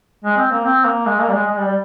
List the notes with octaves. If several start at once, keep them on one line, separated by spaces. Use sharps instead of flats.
G#3
C4
A#3
C4
A#3
G#3
A#3
G3
G#3
G#3
G3
G3